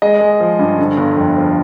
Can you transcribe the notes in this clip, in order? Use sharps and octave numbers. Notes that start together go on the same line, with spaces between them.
G#3 D#5
G#3
F3
G2
D3
G1
F2
F3